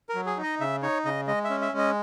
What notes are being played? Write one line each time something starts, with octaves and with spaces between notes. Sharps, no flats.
A#4
F#3
G#4
D#4
D#5
C#3 E5
D#4 C#5
C#3 D#5
G#3 D#5
E5
C#4
E5
G#3
D#5